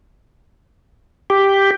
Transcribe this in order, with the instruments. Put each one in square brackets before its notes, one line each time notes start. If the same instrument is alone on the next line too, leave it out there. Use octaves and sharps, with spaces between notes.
[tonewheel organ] G4